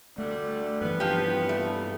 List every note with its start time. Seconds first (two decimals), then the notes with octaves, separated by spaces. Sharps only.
0.18 D2 D3 G3 A3
0.81 G2 E3 B3
1.00 F3 G4
1.49 A3